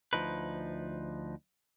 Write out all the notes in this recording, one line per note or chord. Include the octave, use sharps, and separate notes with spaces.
D2 F3 D#4 B4